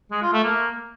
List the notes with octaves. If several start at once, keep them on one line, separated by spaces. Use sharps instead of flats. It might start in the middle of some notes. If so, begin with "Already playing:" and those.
G#3
F4
A3
A#3